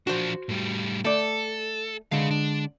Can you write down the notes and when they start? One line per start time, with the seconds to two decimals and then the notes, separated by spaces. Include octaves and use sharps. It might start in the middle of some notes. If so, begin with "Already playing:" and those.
0.07 F3 D4 F#4 C5
0.49 A2 G3
1.05 A3 A4 D5
2.12 D3 G#3 G#4 F5
2.31 D4